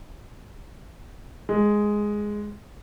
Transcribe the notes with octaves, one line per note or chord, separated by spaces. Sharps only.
G#3